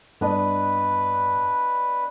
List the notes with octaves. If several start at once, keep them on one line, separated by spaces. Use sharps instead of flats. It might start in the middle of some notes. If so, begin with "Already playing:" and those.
G2 B3 D4 B4 D#5